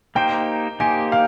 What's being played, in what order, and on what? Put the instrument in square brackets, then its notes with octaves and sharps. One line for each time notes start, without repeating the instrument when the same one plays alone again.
[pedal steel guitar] A#3 D#4 G4 C5 [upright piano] G5
[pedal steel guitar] A#3 D#4 G4 C5 [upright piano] G#5
[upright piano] F5